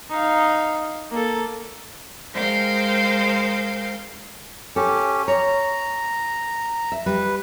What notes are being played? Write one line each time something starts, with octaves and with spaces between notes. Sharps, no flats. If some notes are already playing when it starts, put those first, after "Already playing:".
D#4 F5
A#3 A4
G#3 A#4 C5 F5 G5
C#4 G4 A4
C#5 A#5
E5
G3 B4